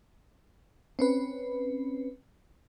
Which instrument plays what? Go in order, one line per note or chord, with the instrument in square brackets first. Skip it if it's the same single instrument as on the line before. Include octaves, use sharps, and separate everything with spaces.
[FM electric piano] C4 C#4 B4